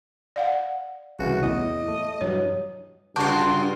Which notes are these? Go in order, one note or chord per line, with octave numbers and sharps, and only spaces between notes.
D5 F5 F#5
C2 C#3 E3 F#4
E2 A2 D#5
A3
G2 E3 F#3 C#5
G2 C#3 F#3 F4 F#4 A5 D6 G6